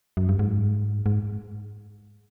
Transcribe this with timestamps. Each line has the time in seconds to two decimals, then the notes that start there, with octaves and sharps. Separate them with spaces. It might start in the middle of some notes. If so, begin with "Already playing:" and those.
0.17 F#2
0.29 G2
0.39 G#2
1.06 G#2